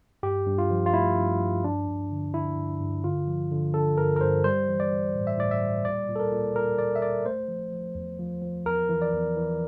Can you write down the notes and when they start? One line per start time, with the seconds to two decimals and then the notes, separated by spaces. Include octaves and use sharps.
0.23 G2 G4
0.46 G2
0.58 F4
0.70 F3
0.86 F4
0.93 A3 E4
1.17 G2
1.41 F3
1.64 G2 D4
1.88 G2
2.10 D3
2.34 D3 E4
2.57 G2
2.80 G2
3.04 D3 F4
3.28 F3
3.51 D3
3.74 D3 A4
3.98 G2 A#4
4.16 A#4
4.21 G2 C5
4.44 G3 C5
4.68 E3
4.80 D5
4.92 G3
5.15 A2
5.27 E5
5.38 A2 D5
5.51 E5
5.62 G3
5.85 A#2 D5
6.09 A#2
6.16 A4
6.20 A#4
6.32 A#2
6.55 A#2 A#4
6.79 A#2 D5
6.96 E5
7.02 A#2 D5
7.26 A3 C5
7.48 F3
7.73 F3
7.95 E2
8.19 F3
8.42 F3
8.65 E2 A#4
8.89 E3
9.02 D5
9.13 E2
9.37 E3